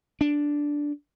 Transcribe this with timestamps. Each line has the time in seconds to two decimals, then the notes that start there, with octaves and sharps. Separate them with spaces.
0.21 D4